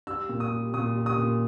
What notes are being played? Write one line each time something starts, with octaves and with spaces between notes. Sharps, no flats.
G3 E6
A#2
D#6
G3
A#2 D#6
G3
D#6
A#2